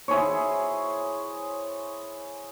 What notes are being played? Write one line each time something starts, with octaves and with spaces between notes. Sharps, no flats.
E4 G#4 C5 C#5